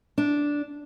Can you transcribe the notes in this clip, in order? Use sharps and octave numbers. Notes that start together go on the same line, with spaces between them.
D4